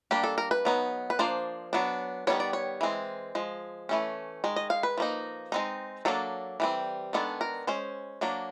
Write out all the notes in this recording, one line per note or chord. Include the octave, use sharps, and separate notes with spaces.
G3 A#3 D4 G4
A4
A#4
B4
F#3 B3 D#4
B4
F3 A#3 D4 C5
F#3 B3 D4
D#3 G3 B3 D4 C#5
D5
C#5
E3 G#3 C4
F3 G#3
E3 A3 C#4
D#3 G#3
D#5
F5
B4
F3 A#3 D#4
G#3 C4 D#4
F#3 A#3 D4 A4
E3 G3 C4
D#3 G#3 B3 D4 A4
A#4
G#3 C#4 C5
F#3 A#3 D4